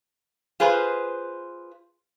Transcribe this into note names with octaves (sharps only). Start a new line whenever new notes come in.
F4 G#4 B4 C5